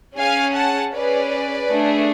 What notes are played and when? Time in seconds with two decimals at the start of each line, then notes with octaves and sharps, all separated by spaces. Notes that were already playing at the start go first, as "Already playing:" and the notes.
0.17 C#4 G#4 F5 G#5
0.56 F#5 A5
0.93 C#4 G#4 B4 D5
1.70 A3 D4 G#4